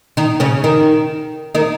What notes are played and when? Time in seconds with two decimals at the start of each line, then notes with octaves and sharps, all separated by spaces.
0.17 D#3 D#4
0.40 C#3 C#4
0.64 D#3 D#4
1.55 D#3 D#4